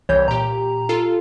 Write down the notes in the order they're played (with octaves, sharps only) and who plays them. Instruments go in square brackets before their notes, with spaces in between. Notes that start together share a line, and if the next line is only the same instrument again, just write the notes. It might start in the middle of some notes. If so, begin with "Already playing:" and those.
[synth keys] C2 E3 G6 [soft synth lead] C#5
[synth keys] A#2 G4 [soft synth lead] A#5
[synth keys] F4 A4